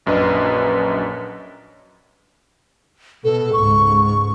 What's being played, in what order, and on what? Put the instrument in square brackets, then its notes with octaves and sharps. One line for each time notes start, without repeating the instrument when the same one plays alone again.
[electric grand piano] A#1 F#2 D4 B4 D#5
[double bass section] B2 [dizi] A4
[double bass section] C#2 G#2 [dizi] C#6